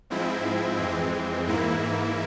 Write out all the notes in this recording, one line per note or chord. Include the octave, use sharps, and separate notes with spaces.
G#2 F3 G#3 C4 E4
F2 E3 G#3 C4
G#2 E3 A#3 E4